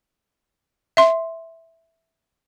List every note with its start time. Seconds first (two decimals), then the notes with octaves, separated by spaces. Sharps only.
0.97 E5 C6